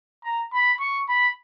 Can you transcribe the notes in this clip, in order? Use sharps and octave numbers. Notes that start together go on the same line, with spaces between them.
A#5
B5
C#6
B5